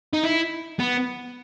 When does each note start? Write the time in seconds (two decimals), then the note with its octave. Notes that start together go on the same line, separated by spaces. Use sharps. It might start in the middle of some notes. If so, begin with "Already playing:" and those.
0.13 D#4
0.23 E4
0.79 B3